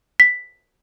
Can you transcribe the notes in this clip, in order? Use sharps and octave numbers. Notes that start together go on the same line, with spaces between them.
B6